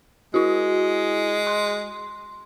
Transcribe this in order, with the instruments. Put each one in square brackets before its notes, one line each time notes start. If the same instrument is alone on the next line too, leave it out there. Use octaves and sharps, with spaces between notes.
[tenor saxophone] G#3 [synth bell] E4 F#4
[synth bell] C6